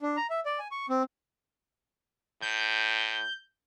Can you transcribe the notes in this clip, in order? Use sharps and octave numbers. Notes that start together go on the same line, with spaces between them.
D4
A#5
E5
D5
G#5
C#6
C4
A2 G6